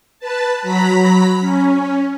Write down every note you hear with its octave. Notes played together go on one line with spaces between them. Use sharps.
B4 A5
F#3 A#5 B5 B6
C#4